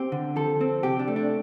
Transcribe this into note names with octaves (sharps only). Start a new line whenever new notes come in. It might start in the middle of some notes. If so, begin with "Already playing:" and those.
Already playing: C4 G4
D3
F3 A4
C4
C3 G4
D4
A3
D4